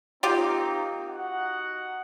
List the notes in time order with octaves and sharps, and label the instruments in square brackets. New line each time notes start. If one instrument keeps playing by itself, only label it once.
[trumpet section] A#3 C4 D#4 [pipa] F4 G4
[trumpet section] D#4 F#4 F#5